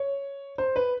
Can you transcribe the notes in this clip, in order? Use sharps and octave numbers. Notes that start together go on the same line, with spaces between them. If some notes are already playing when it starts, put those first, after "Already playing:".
Already playing: C#5
C5
B4